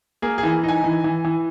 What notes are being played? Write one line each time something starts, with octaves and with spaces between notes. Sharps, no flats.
A#3 G#4
G#4
E3
D#4 G#5
E3
E3
E3